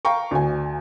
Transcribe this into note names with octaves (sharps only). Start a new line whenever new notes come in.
F5 G5 A#5 C#6
D2 G#5